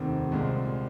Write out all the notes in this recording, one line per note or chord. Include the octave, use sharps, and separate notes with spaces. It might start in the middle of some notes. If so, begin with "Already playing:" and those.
Already playing: F1 D#2 D#3 C4
C2 A#2 G#3 C4